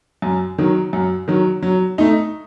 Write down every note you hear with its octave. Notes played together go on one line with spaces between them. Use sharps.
F#2
D#3 F#3
F#2
D#3 F#3
F#3
A3 D#4